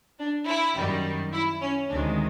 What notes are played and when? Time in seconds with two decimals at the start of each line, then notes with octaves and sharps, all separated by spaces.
0.19 D4
0.47 E4
0.76 F#2 D#3 G3
1.32 E4
1.61 C#4
1.90 D2 C3 D#3 G#3 D4